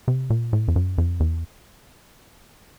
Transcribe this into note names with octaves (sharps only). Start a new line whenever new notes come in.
C3
A#2
A2
F2
F#2
F2
E2